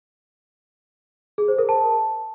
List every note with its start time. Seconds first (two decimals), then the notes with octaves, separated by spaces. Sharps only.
1.38 G#4
1.48 C5
1.58 A#4
1.69 A5